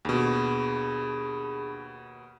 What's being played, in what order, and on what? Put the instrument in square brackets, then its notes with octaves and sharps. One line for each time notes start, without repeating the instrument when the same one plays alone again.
[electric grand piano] D#2 B2 [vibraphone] D4 G#4 B5